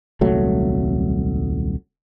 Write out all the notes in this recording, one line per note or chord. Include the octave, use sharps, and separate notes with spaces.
D#1 C2 F#3 A3